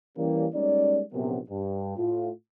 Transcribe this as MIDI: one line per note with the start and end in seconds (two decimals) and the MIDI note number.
0.17 0.46 52
0.17 0.46 55
0.17 0.46 58
0.17 0.46 61
0.55 1.02 55
0.55 1.02 56
0.55 1.02 58
0.55 1.02 61
0.55 1.02 63
0.55 1.02 74
1.13 1.39 34
1.13 1.39 42
1.13 1.39 48
1.13 1.39 59
1.50 1.95 43
1.97 2.30 45
1.97 2.30 65